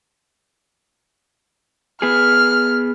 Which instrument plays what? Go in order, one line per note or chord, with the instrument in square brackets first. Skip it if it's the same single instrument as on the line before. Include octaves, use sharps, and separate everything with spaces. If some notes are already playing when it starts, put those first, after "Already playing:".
[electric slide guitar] B3 G#4 [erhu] F6